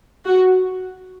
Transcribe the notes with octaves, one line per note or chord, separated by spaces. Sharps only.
F#4